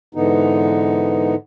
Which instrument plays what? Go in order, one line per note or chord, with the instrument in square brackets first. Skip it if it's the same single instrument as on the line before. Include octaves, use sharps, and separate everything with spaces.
[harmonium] G#2 D3 E3 B3 D#4